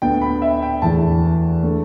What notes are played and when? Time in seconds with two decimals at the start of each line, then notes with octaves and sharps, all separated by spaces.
0.02 D2 D3 B3 D4 G5
0.22 B5
0.42 E5
0.62 G5
0.82 E2 E3 A3 A5
1.63 D3 A3 D4